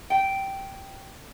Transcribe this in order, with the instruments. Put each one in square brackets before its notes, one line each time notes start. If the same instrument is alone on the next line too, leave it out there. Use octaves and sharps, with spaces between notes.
[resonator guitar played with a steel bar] G5